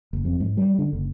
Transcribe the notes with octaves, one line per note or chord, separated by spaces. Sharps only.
F#1
F2
G#2
G3
D3
F#1